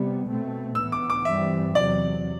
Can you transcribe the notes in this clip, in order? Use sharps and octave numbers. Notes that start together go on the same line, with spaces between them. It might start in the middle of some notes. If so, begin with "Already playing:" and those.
Already playing: C3 G3 B3
B2 A3 C4
A2 E3 B3 E6
D6
D6
G2 E3 G3 C4 E5
E2 C3 F#3 D5